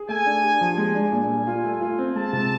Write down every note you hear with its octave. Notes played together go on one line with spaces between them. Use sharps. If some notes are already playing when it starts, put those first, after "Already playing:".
Already playing: G#4
A3 G#5
D4
G4
F3
G#3 G#5
D4
A#2
G3
F4
A3
F4
C4
G#3 A5
C3